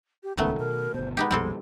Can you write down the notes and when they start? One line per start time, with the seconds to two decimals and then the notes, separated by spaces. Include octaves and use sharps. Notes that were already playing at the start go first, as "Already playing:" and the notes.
0.23 G4
0.37 D#1 C#2 D#3 F#3 A3 B3 C#4
0.59 B2 A#4
0.94 G1 B2 C5
1.17 G#3 B3 D#4 G4
1.31 A#1 F2 B2 G3 C4 A4